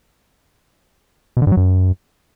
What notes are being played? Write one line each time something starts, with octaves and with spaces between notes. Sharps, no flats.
B2
D3
G2
F#3
F#2